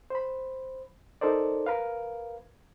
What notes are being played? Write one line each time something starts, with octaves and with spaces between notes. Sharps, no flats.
C5 B5
D#4 A4 A#4 C5 D5
A#4 B4 F5